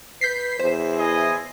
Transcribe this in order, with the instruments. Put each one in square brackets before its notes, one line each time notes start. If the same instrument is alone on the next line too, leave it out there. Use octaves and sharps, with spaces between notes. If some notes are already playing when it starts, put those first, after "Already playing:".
[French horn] B4 [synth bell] G6 B6 C7
[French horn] E2 [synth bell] C5
[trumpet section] E4 D#5 G#5